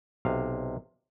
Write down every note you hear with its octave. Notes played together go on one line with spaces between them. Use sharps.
B1 C3 F5